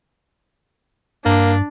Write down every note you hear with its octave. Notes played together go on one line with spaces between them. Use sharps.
G2 A#3 D4